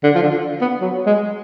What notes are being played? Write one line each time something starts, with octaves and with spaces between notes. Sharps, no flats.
D3
F3
D3
B3
F#3
G#3